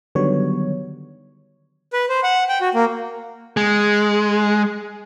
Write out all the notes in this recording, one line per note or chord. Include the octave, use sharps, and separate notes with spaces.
D3 D#3 F#3 G3 B3 C#5
B4
C5
F#5
G5
F#4
A#3
G#3